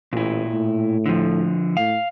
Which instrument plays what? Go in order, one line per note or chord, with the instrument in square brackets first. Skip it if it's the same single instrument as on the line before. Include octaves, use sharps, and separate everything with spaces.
[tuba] A1 [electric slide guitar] A#2 E4
[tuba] A2
[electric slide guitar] D3 F3
[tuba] A2 [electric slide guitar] F5